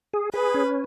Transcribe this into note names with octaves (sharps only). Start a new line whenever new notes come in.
G#4
G#4 B4
C#4